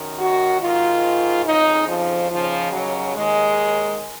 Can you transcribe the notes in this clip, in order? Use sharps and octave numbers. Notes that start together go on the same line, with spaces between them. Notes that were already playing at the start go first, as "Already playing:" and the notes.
Already playing: F#2 D#3
F#4
G#2 D#3 F4
F2 C#3 D#4
F3
D#2 C#3 F3
F#3
D#2 D#3 G#3